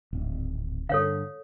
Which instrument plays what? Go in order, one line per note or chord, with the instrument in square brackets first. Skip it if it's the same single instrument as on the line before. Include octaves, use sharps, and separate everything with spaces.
[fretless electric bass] D1 G#1
[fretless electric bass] G2 D3 [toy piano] A4 C#5 F5